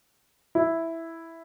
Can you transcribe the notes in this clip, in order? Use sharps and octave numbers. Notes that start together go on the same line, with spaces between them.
E4